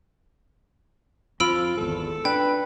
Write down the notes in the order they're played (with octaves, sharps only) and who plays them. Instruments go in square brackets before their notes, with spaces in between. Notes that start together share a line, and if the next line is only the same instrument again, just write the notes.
[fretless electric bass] F2 F3 [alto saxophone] F4 [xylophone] B5 E6 D7
[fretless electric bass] G#1 E2 [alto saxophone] A4
[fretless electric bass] D4 [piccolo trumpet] B4 [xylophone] G5